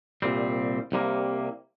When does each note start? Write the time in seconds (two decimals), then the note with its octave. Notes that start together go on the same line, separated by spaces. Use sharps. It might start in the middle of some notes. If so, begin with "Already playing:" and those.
0.22 C2 A#2 G3 C4
0.92 C2 C3 G3 A#3